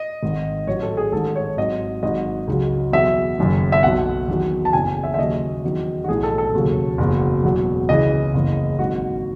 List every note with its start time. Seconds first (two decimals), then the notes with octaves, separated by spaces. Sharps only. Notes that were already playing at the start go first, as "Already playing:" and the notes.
Already playing: D#5
0.23 G#1 G#2 D#3
0.67 A1 A2 F#3 C#5
0.82 A4
0.97 G#4
1.12 A1 G#2 D#3 A4
1.35 C#5
1.57 G#1 G#2 F#3 D#5
2.03 G#1 G#2 F#3 D#5
2.48 C#2 C#3 F#3
2.92 E2 B2 F#3 E5
3.38 F#1 F#2 D#3
3.72 E5
3.83 B1 B2 F#3 F#5
4.28 E2 D#3 F#3
4.65 A5
4.73 F#1 E2 C#3 G#5
5.04 E5
5.14 E5
5.18 D#2 C#3 F#3 D#5
5.64 E2 D#3 F#3
6.04 F#4
6.08 B1 A2 E3 G#4
6.23 A4
6.38 A4
6.54 E1 D#2 C#3 F#3
6.98 F#1 E2 B2 F#3
7.43 E1 E2 B2 F#3
7.89 C#2 C#3 E3 D#5
8.34 F#1 E2 C#3 E3
8.79 G#1 G#2 F#3 F#4